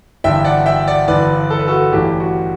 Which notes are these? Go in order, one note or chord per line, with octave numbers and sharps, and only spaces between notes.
G1 G2 E3 E5 G5
D5 F#5
E5 G5
D5 F#5
G1 G2 E3 B4 D5
A4
B4
F#4 A4
A1 G2 E3 G4
F#4